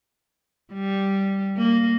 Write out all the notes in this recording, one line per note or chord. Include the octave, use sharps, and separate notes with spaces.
G3
A#3